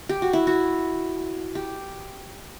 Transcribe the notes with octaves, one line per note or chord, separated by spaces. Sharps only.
G4
F#4
E4
F#4
G4